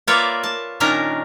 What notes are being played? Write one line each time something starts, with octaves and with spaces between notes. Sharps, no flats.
A#3 F4 B4 C#5 D5 E5
A5
A#2 D#3 C#4 D4 A#4 A#5